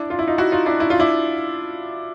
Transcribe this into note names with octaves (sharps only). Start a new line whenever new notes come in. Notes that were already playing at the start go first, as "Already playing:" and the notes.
Already playing: D4 E4
F4
E4
D#4 F4
E4 F#4
D#4 F4
D4 E4
E4
F4
D4 E4